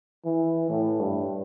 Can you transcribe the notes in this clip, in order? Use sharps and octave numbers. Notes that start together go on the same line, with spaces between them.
E3
A2
G2